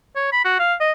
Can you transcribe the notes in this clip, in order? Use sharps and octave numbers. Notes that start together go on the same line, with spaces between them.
C#5
B5
F#4
F5
D#5